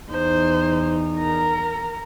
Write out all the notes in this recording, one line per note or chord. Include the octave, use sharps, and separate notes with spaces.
E2 D#4 C5
A#4 A#5